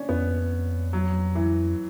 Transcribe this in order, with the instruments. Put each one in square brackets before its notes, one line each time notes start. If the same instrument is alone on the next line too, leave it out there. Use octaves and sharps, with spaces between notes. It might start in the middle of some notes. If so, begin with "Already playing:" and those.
Already playing: [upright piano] C#4 D4
[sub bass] F2 [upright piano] B3
[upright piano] F#3
E3